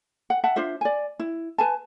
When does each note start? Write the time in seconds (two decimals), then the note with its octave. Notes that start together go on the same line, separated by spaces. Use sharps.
0.30 F#5
0.44 E5 F#5 A5
0.56 D4 F4 C5 E5
0.81 D5 G#5
1.19 E4
1.58 B4 G#5 A5